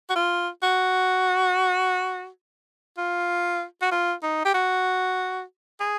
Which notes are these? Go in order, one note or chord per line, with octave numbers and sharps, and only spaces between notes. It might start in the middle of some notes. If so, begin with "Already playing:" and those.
F#4
F4
F#4
F4
F#4
F4
D#4
G4
F#4
G#4